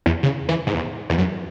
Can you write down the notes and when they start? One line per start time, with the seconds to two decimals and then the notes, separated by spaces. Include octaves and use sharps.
0.06 E2
0.23 C#3
0.49 E3
0.67 G#2
0.75 E2
1.10 E2
1.18 F#2